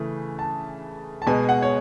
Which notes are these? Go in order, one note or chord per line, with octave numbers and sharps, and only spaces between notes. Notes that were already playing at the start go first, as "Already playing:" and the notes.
Already playing: C#3 E3 A3
A5
A5
B2 G#3 B3 G#5
F#5
C#5